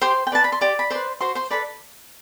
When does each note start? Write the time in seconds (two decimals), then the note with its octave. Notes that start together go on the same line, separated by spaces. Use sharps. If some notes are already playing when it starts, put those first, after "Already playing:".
0.02 G4 C5 C6
0.27 G5
0.32 B4 D5 A5
0.44 B5
0.52 C6
0.61 G4 D5 D6
0.79 B5
0.91 B4 C5 D5 C6
1.21 F#4 C5 C6
1.35 C5 C6
1.51 A4 B4 D5 B5